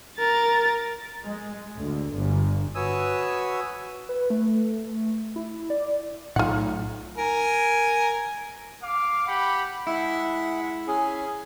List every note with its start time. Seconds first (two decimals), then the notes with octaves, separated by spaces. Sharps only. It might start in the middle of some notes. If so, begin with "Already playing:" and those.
0.17 A#4 A6
1.22 G#3
1.76 D2
2.12 G1
2.75 F#4 B4 C#5 G#5 D#6 E6
4.09 B4
4.30 A3
5.36 E4
5.70 D5
6.36 B1 A2 D#4 F4 F#5
7.17 A#4 G#5
8.83 F5 D6
9.27 G4 F#5 B5
9.87 G#3 E4 E5 F#5
10.87 C#4 G#4